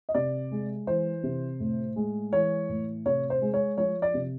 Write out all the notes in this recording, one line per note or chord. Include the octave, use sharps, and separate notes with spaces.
D#5
C3 D5
G#3
E3 C5
C3
A2
G#3
E3 C#5
A2
C3 C#5
C5
G#3
C#5
F3 C#5
D5
C3